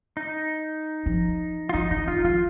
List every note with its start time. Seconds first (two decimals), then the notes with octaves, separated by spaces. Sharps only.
0.17 D#4
1.06 F3
1.69 F4
1.73 F3 D#4
1.91 D#3 D#4
2.07 D#3 F4
2.24 F3 F4